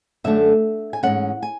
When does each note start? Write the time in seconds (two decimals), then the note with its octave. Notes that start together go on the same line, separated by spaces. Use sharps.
0.24 F#2 D3 A3 D4 E5
0.93 G#5
1.03 A3 C#4 F#5
1.07 G#2 E3
1.43 G#5